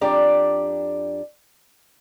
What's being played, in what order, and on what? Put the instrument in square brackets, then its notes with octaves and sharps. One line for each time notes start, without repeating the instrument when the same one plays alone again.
[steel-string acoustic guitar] F2 D4 G4 D5 A#5